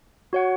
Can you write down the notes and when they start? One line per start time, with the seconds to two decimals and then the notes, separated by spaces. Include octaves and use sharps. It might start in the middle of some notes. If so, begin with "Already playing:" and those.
0.33 F#4 C#5 F#5